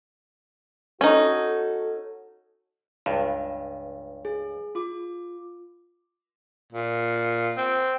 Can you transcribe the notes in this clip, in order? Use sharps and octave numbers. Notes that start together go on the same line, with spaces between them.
C#4 D#4 F#4 A4
C#2 G2
G#4
F4 D6
A#2
C4